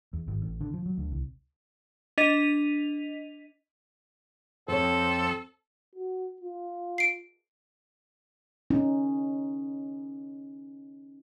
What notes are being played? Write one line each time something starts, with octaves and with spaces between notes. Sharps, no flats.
E2
G#1
A1
D3
F3
F#3
D2
C2
D4 D#5 B6 D#7 F7
F2 C4 A4 C5 C#5
F#4
F4
C7 D7
C#4 D#4